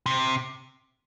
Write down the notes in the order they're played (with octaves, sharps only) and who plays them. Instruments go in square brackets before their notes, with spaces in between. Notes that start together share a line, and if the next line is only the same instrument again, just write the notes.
[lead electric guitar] C3